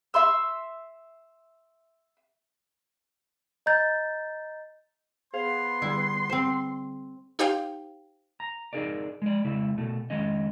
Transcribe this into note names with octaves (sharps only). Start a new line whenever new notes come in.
E5 C6 E6
D#5 A#5 G6 A6
B3 G#4 C5 F5 C6
D3 G3 E4 G#4
C4 C5
D#4 G4 C5 F5 G5
A#5
D#4 G#4 A#4 D5
G#3 D5
C#3 G#3 E4
B2 A3
D#3 G#3 C#4 D#5